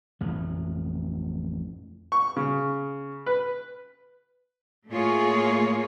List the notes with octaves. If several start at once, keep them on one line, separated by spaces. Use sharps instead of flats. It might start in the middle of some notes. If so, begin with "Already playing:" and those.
A1 F2 A3
C#6
C#3
B4
A2 A3 A#3 F4 G#4 C#5